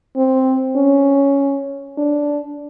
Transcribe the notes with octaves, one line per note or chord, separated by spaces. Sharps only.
C4
C#4
D4